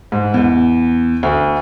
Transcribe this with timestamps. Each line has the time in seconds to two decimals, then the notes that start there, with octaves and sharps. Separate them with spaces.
0.12 G#2
0.34 E2
1.23 D2